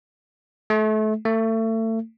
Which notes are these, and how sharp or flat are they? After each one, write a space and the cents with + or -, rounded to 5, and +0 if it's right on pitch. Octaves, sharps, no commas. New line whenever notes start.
A3 -30
A3 +30